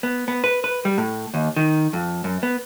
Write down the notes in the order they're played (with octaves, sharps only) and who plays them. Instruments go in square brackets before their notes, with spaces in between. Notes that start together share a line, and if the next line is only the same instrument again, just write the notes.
[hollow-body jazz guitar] B3
B3
B4
B4
G3
A2
D#2
D#3
F2
F#2
B3